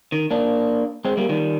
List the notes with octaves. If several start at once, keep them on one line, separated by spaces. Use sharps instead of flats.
D#3
A#3 D4
G#3 C4
G3 A#3
D#3 G3